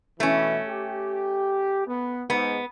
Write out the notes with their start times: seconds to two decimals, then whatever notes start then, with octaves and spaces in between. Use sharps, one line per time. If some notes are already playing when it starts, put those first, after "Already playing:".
0.20 B2 E3 A3 C#4
0.68 G4
1.87 B3
2.30 G#2 B3